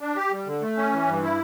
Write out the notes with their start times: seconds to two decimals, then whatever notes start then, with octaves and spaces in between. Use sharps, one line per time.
0.01 D4
0.16 G4
0.32 G3
0.47 D3
0.62 A3
0.77 C#4
0.93 E3
1.07 G2
1.23 E4